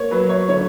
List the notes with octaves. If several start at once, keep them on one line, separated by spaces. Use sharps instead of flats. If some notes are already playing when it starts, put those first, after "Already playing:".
Already playing: A#3 C#5
F#3 B4
C#5
D3 C#5